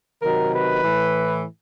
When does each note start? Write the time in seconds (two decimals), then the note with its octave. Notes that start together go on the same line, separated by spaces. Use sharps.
0.22 C3 D#3 F#3 A#4
0.52 B4
0.82 A2 E3